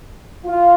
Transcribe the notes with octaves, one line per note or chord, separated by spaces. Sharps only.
F4